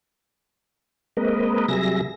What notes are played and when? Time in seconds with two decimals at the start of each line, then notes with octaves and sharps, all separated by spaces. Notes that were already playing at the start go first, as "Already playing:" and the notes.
1.17 G#3 A#3 C4 A#4 B4 D#5
1.68 C3 F#3 G3 G#4 E5 A#6